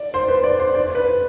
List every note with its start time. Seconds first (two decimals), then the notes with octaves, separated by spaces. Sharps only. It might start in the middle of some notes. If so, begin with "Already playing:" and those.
Already playing: D5
0.14 C5
0.28 B4
0.44 D5
0.60 C5
0.75 D5
0.95 B4